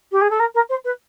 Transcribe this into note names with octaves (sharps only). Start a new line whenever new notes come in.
G4
G#4
A4
A#4
A#4
C5
B4